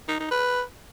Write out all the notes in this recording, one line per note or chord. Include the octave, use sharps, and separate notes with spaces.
D#4
D#4
B4